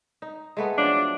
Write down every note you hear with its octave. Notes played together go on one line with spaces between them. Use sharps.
D#4
G#3 A3 B3
F3 F#3 D4 D5